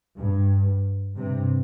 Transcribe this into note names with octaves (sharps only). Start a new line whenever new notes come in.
G2
G2 C3